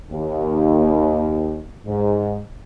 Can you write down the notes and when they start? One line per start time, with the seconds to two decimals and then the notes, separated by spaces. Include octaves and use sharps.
0.10 D#2
1.87 G#2